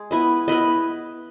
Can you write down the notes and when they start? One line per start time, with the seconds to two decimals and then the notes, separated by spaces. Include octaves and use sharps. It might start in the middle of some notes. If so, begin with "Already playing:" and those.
Already playing: G#3 G#4
0.11 B3 E4 B4 D#5
0.48 B3 E4 B4 D#5